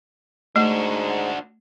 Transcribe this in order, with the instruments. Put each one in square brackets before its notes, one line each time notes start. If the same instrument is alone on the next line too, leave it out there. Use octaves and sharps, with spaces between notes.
[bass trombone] G#2 [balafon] A3 [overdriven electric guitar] D4 F#4